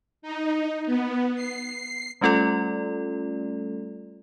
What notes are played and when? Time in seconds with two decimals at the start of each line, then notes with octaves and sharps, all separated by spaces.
0.22 D#4
0.86 B3
1.35 C7
2.21 G3 A3 C#4 F4 A4 D5